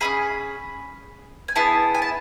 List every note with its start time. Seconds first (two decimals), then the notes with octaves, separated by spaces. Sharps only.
0.01 C#4 E4 G#4 B5
1.48 G#5
1.56 B3 E4 G#4 A5
1.95 G#5
2.02 A5